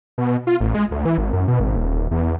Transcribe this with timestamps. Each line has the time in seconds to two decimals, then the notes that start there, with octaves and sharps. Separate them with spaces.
0.18 B2
0.47 F4
0.60 A1
0.75 G#3
0.91 D2
1.05 E3
1.18 G#1
1.33 F#2
1.48 B2
1.60 G#1
1.76 D#1
2.11 E2